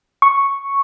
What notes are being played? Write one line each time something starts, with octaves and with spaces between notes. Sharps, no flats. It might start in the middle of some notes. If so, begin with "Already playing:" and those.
C#6